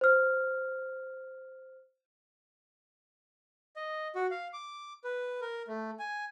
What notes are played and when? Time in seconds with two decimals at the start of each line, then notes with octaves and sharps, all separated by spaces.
0.01 C5 F6
3.76 D#5
4.15 F#4
4.31 F5
4.53 D6
5.04 B4
5.41 A#4
5.68 A3
5.99 G#5